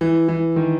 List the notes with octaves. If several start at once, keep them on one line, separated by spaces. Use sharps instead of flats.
E3
E3
D#3